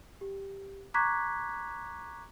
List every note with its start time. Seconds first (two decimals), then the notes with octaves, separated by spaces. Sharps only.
0.21 G4
0.94 A#5 C#6 D6 F#6 G#6 B6